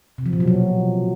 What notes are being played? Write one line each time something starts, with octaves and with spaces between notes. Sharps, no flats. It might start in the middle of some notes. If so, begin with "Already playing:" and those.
C3
F3
A#2
F#3
B2